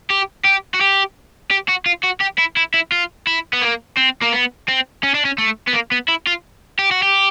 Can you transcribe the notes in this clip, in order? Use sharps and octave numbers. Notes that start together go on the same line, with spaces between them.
G4
G4
F#4
G4
G4
F#4
F4
F#4
G4
E4
E4
E4
F4
E4
B3
A#3
C4
A#3
B3
C4
C#4
D4
C#4
A3
B3
A#3
B3
E4
F4
G4
F#4
G4